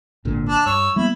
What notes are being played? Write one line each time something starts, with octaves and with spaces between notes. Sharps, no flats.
G#1 A#2 D3
D4
G2 C#5 E6
G3 A#3 B3 E4